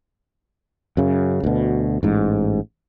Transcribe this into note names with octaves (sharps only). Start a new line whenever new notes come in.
F#2 C#3
D2 B2
A1 G#2